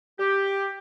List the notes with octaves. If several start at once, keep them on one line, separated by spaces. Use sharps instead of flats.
G4